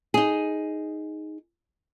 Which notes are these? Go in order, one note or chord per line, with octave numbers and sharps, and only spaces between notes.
D#4 G#4